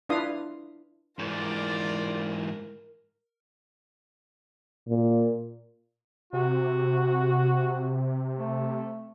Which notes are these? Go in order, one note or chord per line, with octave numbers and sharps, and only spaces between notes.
D4 E4 F4 B4 F5 D#6
G#2 E3 F4 A#4 D5
A#2
C3 F#4
A3